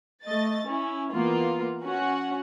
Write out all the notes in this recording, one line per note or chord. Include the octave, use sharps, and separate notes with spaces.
A3 D#5 A6
C#4 E4
E3 A#3 B3 F4
C#4 F#4 F#5